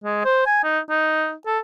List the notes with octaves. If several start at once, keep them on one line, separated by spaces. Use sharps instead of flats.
G#3
C5
G#5
D#4
D#4
A4